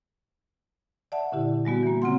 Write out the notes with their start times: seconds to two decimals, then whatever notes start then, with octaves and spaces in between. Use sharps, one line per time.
1.12 D5 E5 F#5 A5
1.32 A#2 D3 E4 G4
1.65 G3 G#3 B3 F#4
1.83 E3 A#3
2.02 C#3 C4 F4 F#5 C6